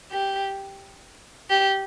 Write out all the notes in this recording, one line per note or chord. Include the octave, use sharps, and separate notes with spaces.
G4
G4